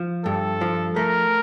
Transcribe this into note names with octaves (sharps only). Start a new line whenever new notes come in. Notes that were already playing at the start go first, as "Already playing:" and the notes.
Already playing: F3
G2 A4
F3
A3 A#4